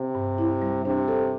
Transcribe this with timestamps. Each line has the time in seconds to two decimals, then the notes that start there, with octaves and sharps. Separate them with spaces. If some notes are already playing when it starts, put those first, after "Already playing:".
Already playing: C3
0.15 G2
0.38 E4
0.62 G3
0.85 C3 D4
1.08 A4